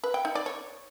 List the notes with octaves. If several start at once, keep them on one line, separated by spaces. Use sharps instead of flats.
B4
G5
D#4
D5
C#5